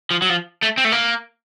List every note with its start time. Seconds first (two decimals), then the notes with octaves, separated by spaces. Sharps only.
0.11 F3
0.22 F#3
0.29 F3
0.63 A3
0.77 C4
0.85 A3
0.92 A#3